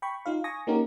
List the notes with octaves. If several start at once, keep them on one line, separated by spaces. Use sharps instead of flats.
G5 B5 C#6
D#4 F4 F5
G#5 C#6 D#6 A#6
A#3 C#4 D#4 F#4 G4 A#4